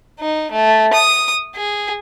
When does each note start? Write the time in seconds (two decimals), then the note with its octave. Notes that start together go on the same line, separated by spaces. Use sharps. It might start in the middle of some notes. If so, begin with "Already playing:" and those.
0.20 D#4
0.51 A3
0.93 D#6
1.56 G#4